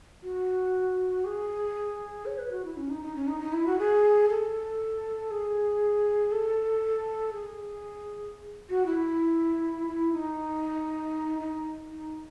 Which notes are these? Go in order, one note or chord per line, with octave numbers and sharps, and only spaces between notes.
F#4
G#4
C#5
B4
F#4
E4
C#4
D#4
D#4
C#4
D#4
D#4
E4
F#4
G#4
A4
G#4
A4
G#4
F#4
E4
E4
D#4
D#4
D#4